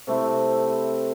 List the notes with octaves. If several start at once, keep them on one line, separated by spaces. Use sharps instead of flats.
C3 A3 C4 E4